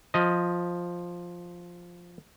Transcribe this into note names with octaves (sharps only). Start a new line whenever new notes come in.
F3 D#5